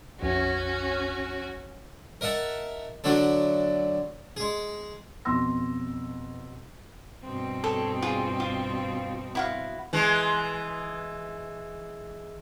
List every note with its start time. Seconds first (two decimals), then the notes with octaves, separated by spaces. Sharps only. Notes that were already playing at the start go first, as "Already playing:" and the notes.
0.21 A#1 F2 C#4 F#4
2.21 A#4 D#5 E5 F#5 A5
3.04 D3 F#3 A3 D4 A4
4.37 G#3 G#4
5.25 F2 B2 C6 E6 A#6
7.23 G2 B2 C4
7.64 A4 C#5
8.02 F4 G#4
8.40 F4
9.35 E4 F#4 F5
9.93 E3 G#3